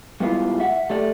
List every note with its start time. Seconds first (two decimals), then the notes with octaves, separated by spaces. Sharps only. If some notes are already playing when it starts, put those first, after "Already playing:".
0.20 G#2 G3 B3 E4 F4 G4
0.60 E5 F#5
0.90 A3 G4 D5